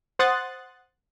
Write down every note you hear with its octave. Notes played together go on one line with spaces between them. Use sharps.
C5 F#5 C6 D#6 F#6 A6